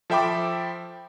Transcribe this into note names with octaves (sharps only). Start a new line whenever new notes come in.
F3 A4 E5 G5 B5 D6